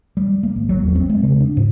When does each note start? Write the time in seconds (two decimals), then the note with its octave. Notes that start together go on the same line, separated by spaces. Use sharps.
0.17 G3
0.43 A#3
0.56 G#1
0.69 F#3
0.83 E2
0.95 C4
1.09 G#3
1.23 C#3
1.40 D4
1.57 G#2